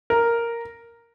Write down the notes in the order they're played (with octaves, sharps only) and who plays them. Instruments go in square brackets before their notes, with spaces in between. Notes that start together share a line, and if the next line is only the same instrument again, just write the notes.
[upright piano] A#4